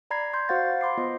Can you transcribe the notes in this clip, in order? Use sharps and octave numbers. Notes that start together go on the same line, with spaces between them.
D5 A#5 B5 G#6 C7
C6 G6
F#4 C5 F5 F#5 A6
B5 C6 D6 C7
B3 F4 C5 D#5